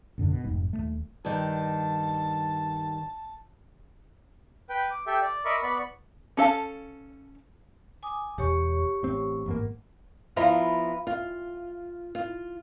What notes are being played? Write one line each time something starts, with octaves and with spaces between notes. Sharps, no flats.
A1 F#2 D3 D4
B2
F1 G#2 G#3
D#1 F2 A3
G2 D#3 A5
B4 G5
D6
G4 A4 E5 G5
D5
A#4 D#5 E5 B5 C#6 D6
B3 D5 B5 C#6
C#4 A4 F5 A5
G#5 D6 D#6
E1 G4 C#5 C#6
A1 C4
A1 G#2 A#3
F3 B3 E4 F4 A#5
F4
F4